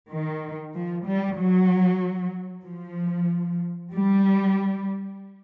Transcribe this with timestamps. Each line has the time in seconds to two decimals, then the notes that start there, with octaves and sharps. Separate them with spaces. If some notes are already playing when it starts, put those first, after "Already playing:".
0.10 D#3
0.74 F3
1.06 G3
1.38 F#3
2.66 F3
3.93 G3